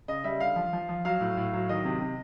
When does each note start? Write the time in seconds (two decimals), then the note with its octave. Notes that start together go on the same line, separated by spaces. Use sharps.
0.08 C#3 D#5
0.24 G3 E5
0.40 D3 F5
0.56 F3
0.73 F3
0.89 F3
1.05 F#3 F5
1.21 A2
1.37 A2
1.53 F#3
1.69 D#3 D#5
1.85 C3
2.01 C3